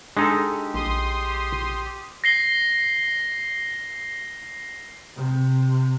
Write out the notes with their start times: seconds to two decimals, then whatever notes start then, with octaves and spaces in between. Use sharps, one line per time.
0.17 G#3 D4 D#4 G4 A4
0.74 A#1 C6 D#6
2.24 A#6 C7 G7
5.16 C3